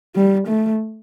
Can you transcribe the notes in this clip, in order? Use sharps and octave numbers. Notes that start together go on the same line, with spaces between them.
G3
A3